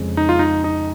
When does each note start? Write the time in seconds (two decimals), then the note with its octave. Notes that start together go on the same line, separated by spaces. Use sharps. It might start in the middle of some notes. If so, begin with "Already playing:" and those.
Already playing: F2 C#3 G#3
0.17 D#4
0.29 F4
0.39 D#4
0.64 D#4